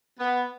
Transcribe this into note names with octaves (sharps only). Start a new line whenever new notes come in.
B3